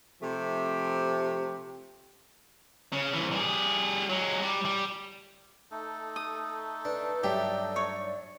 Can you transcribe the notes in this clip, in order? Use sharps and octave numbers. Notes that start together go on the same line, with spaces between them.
C3 F3 A3 G4
C#3
C2 E3
G3 G#4
F#3 G#3
G3
G3
A3 D#4 A4
D#6
D4 B4
G2 F#3 G4 D5 E5
C#5